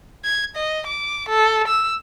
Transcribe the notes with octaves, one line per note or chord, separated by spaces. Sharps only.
G#6
D#5
D6
A4
E6